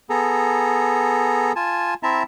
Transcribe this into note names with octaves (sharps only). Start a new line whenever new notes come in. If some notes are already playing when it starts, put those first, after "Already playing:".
B3 G#4 A4 A#5
F4 G#5 A5
C4 E4 E5 A5 A#5